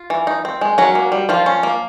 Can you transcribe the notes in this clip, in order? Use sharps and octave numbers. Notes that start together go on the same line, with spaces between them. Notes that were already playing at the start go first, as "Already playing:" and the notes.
Already playing: F4
E3
D#4
C4
G#3
F#3 C#4 F#4
A#3
G3
F3 G3 F4
C#4
A#3